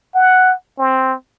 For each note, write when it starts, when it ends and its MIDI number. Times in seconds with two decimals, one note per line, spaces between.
0.15 0.53 78
0.78 1.15 60